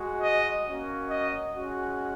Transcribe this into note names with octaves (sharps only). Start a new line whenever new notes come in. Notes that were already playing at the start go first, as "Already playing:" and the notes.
Already playing: G#3 F#4
D#5
A#3 C#4 F#4
D#5
G#3 C#4 F#4